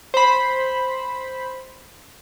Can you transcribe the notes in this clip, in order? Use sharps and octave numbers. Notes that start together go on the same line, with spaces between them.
C5 B5